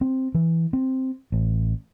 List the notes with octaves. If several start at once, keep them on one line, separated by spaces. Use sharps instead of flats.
C4
E3
C4
A1